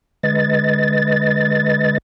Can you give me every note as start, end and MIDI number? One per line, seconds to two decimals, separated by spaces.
0.23 1.98 50
0.23 1.98 56
0.23 1.98 71
0.23 1.98 75
0.23 1.98 93